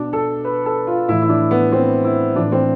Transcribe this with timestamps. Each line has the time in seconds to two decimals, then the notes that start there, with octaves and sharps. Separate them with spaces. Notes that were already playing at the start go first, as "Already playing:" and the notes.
Already playing: B2 D4
0.13 A4
0.45 B4
0.66 A4
0.87 F4
1.08 A2 E3 E4
1.22 E4
1.29 D4
1.51 B3
1.72 C4
2.05 E4
2.36 A2 E3 D4
2.52 C4